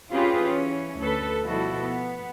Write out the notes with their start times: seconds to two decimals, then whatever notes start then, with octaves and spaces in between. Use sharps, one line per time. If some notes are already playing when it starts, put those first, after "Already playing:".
0.12 C4 C#4 F4 G4 G#4 B4
0.42 E3 C#4
1.00 D2 A4 B4
1.42 B2 F3 G3 E4 F#4 A4
1.81 B3